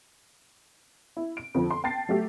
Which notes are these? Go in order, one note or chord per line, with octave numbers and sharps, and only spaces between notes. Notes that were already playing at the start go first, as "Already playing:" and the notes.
E4
D7
F2 D3 F3
C6
G5 A5 A6 C7
F#3 A3 G4